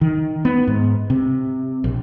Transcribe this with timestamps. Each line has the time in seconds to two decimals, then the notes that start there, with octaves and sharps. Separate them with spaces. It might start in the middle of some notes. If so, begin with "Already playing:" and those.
0.01 D#3
0.45 B3
0.67 G#2
1.10 C3
1.84 A#1